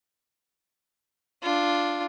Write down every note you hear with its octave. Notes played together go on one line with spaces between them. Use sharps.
D4 F4